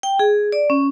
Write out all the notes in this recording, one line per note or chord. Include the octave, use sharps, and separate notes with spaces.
G5
G#4
D5
C#4